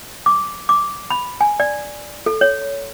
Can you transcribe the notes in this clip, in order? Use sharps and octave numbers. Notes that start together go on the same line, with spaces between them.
D6
D6
B5
G#5
D5
A4
C#5